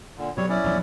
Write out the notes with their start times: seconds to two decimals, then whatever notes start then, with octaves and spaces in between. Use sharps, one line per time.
0.18 A#2 D3
0.37 B2 F#3 G3 C#5
0.49 C#4 E4 D5
0.64 A#1 E2 F#3